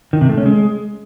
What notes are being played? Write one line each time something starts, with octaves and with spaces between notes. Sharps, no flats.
D#3
C3
A3
C#4
G#3